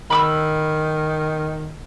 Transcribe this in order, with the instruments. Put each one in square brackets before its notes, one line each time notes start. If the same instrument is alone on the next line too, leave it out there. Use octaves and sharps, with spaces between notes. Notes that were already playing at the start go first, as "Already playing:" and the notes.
[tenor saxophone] D#3 [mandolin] B5 D6 E6